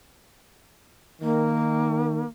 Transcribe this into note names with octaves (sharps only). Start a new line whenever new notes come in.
D#3 A#3